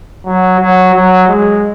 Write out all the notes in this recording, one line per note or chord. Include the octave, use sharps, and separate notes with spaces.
F#3
F#3
F#3
G#3